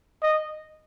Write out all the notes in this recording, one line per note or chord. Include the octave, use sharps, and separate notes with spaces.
D#5